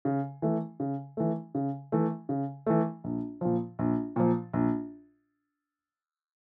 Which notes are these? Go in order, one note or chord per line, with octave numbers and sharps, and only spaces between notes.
C#3
E3 A3
C#3
E3 A3
C#3
E3 A3
C#3
E3 A3
A#1
A#2 F3
A#1
A#2 F3
A#1